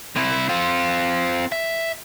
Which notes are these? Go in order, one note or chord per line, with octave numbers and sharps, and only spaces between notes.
C3 E4
C4 F4
E5